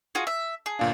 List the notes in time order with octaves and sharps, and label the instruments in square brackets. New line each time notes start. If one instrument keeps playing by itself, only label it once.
[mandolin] F4 F#4 G#4
E5
G#4
[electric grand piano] G1 A#2 D4 [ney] F5